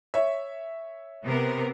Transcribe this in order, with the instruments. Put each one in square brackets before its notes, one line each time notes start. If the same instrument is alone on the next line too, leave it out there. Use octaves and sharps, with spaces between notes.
[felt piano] C#5 E5
[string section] C3 B3 A#4